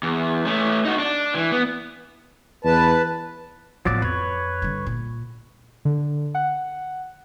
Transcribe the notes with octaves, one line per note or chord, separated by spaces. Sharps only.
E2
A3 C#4
D#4 F#4
D4
E3
B3
E2 B4 A5
A1 F3 F#3 B3 D5
F2 B4 C#5
G2 D3
A#2
D3
F#5